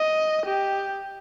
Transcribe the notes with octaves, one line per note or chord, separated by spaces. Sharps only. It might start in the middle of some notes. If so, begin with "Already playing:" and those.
Already playing: D#5
G4